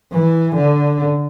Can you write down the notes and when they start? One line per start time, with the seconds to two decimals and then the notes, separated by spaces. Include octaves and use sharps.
0.12 E3
0.55 D3